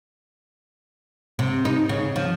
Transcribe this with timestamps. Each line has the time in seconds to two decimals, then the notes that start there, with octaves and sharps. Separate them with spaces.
1.39 C3
1.65 D#4
1.89 C#3
2.16 F3